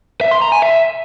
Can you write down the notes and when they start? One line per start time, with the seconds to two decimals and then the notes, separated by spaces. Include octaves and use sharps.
0.21 E5
0.31 C6
0.42 A#5
0.52 G#5
0.62 E5